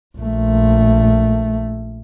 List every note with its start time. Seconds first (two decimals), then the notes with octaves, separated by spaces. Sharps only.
0.17 A#1 A3